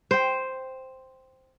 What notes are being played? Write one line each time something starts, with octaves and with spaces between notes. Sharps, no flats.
C5 G5